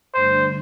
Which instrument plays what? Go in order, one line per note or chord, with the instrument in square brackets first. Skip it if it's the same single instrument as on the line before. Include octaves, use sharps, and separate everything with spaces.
[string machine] G2 D3 A3 D4 [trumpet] C5